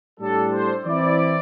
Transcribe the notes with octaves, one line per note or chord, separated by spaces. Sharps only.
A2 G3 D4 A4
C5
E3 C4 E4 D5